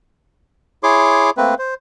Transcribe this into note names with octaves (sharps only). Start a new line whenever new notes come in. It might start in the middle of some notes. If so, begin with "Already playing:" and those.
E4 G#4 C#5 C6 D6
A3 A#3 C4 B4
C5